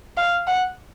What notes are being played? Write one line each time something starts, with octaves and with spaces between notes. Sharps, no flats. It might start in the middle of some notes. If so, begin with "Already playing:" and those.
F5
F#5